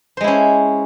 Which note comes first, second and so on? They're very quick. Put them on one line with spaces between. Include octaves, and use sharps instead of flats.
C5 G#3 E4 C#4